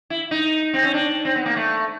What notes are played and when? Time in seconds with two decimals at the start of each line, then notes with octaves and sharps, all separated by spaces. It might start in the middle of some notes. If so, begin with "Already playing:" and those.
0.10 E4
0.31 D#4
0.74 C4
0.84 C#4
0.94 D4
1.25 C4
1.36 B3
1.46 A#3
1.56 A3